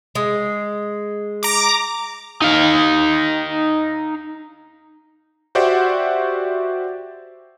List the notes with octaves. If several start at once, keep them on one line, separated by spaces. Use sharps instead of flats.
G#3
A#5 D6
D#4 F5
F#4 G4 C5 D5 E5 F#5